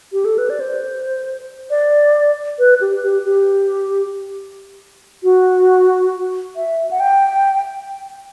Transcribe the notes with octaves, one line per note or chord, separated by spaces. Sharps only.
G4
A4
B4
D5
C5
D5
B4
G4
G4
G4
F#4
E5
F#5
G5